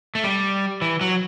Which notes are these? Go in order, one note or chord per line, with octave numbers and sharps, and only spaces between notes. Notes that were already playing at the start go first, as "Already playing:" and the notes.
A3
G3
E3
F#3